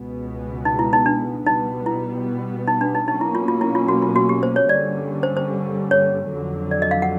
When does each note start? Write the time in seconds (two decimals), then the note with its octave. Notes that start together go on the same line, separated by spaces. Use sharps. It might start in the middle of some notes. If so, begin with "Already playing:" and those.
Already playing: C#2 B2 G#3 B3
0.65 D#4
0.79 E4
0.93 D#4
1.06 D4
1.46 B2 G3 B3 D#4
1.86 E4
2.68 D#4
2.81 D4
2.95 D#4
3.08 B2 F#3 A#3 C#4 D#4
3.21 E4
3.35 F4
3.48 F4
3.61 E4
3.75 F4
3.88 F#4
4.02 F4
4.16 F#4
4.29 G4
4.43 C5
4.56 C#5
4.69 G2 D3 G3 A#3 C#4 D5
5.23 C5
5.37 C5
5.91 C#5
6.31 F2 D3 F#3
6.71 D5
6.82 D#5
6.91 F5
7.02 F#5